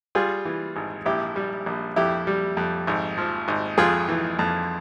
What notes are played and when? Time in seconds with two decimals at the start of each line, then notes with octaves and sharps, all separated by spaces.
0.15 G3 F4 G#4
0.45 E3
0.76 G#1
1.06 A#1 E4 G4
1.36 G3
1.66 A#1
1.96 F2 E4 G4
2.27 G3
2.57 F2
2.87 G#1
3.18 F3
3.48 G#1
3.78 F2 F4 G#4
4.09 E3
4.39 F2